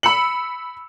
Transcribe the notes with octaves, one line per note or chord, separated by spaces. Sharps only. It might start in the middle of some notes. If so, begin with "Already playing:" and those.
B5 E6 C#7 F#7